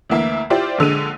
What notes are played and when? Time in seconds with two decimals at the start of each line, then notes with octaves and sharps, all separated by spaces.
0.10 D2 E3 A#3 E5
0.50 E4 F4 G4 C5 D5
0.78 A#1 D3 G#3 D#7